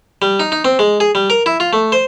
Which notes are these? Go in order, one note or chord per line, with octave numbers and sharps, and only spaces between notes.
G3
D#4
D#4
C4
G#3
G#4
G3
A#4
E4
F4
A3
C5